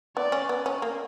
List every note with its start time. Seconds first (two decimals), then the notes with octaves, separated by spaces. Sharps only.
0.16 B3 D5
0.32 C#4
0.49 B3
0.66 C#4
0.82 A#3